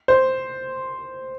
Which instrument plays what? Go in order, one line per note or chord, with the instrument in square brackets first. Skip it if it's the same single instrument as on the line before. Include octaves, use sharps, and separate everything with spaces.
[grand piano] C5